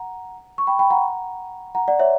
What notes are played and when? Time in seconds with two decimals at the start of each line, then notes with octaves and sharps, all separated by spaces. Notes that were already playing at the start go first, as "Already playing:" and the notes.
Already playing: F#5 A#5
0.58 C#6
0.67 G5 B5
0.79 G5 B5
0.91 F#5 A#5
1.75 F#5 A#5
1.88 D5 F#5
1.99 C#5 E5